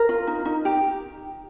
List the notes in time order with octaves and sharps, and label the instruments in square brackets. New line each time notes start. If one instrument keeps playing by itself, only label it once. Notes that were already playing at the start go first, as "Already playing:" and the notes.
Already playing: [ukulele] A#4
F4
D#4
D#4
G4